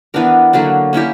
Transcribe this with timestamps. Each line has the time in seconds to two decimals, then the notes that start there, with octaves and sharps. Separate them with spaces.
0.14 E3 B3 D4 A#4
0.53 D3 F#3 A#3 D4
0.93 A#3 C#4 E4 G4